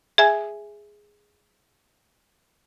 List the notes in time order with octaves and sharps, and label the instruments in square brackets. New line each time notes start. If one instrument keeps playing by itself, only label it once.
[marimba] G#4 E5 G#5